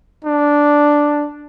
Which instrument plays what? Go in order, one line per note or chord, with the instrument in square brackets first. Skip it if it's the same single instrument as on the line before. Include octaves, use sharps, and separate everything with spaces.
[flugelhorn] D4